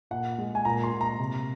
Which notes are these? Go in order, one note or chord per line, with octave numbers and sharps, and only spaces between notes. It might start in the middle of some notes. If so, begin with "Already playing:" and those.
A#2 F#5
G#3
G#5
A#2 A#5
C6
A#2
A#5
C3